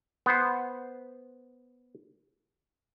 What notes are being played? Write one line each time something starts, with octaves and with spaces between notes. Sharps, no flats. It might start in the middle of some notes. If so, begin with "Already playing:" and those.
B3 C5